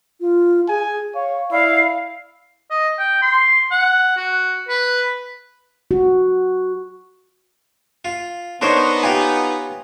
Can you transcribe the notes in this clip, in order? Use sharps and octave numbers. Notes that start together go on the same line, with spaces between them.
F4
G#4 G#5
C#5 F5
E4 D5 F5
D#5
G5
C6
F#5
F#4
B4
F#4
F4
B3 D4 D#4 A#4 C5 C#5 C6
F4 G4 G#5